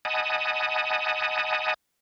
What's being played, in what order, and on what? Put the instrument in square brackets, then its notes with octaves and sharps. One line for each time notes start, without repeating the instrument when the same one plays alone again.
[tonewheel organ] D#5 F#5 G#5 A5 B5 D#6